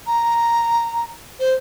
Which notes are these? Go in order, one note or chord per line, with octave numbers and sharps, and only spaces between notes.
A#5
C5